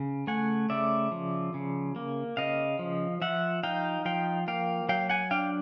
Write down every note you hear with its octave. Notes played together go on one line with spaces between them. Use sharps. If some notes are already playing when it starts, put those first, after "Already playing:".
Already playing: C#3
A3 F#5 G#5
C#3 D5 E5
F3
C#3
A#3
C#3 D#5 F5
F3
F3 E5 F#5
D#4 F5 G5
F3 F5 G5
A#3 F5 G5
F#3 F5 G5
F#5 G#5
D4 F5 G5